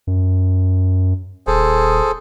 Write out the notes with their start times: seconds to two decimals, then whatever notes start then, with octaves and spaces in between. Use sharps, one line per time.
0.07 F#2
1.47 D#1 G#4 A4 C5